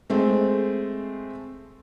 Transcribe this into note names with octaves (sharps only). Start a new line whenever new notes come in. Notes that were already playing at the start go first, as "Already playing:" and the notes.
G#3 A3 C4